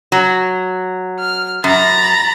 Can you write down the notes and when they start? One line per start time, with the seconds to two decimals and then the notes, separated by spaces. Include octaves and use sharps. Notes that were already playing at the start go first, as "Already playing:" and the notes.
0.12 F#3
1.18 F6
1.64 F#2 A#5 B5 A6